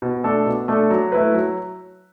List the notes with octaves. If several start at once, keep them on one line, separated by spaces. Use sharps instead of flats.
B2
A3 D4 A4
B2
A3 D4 A4
F#3
A3 E4 B4
F#3